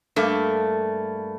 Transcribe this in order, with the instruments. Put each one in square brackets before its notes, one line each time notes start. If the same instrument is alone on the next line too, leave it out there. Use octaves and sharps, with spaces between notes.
[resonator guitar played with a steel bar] G2 A3 A#3